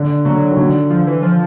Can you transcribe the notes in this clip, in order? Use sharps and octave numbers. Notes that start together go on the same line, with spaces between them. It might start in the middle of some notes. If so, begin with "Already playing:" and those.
Already playing: D3
D3 F#3
D#3
D3
F3
E3
F3